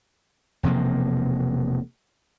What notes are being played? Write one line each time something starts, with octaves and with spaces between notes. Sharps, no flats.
E1 C3 F3 A#3